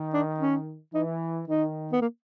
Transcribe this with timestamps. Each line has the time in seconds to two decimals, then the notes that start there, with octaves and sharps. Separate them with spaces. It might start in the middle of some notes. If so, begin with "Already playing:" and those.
Already playing: D#3
0.13 D4
0.40 C#4
0.94 E3 D#4
1.48 D#3 D#4
1.92 B3
2.01 A#3